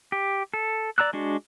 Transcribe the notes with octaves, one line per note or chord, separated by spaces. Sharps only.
G4
A4
D5 A#5 E6 F#6
G#3 D4 F#4